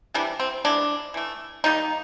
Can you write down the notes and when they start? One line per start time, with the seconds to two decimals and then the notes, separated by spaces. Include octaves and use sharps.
0.14 C3 E3 G3 D4
0.40 C4
0.64 E3 G#3 B3 D4
1.14 E3 A3
1.64 D#3 G3 A#3 D#4